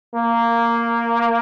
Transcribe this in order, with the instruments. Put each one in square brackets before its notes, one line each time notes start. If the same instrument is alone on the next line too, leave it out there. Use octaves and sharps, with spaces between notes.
[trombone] A#3